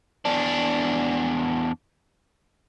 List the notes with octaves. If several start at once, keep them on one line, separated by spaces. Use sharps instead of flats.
E2 D4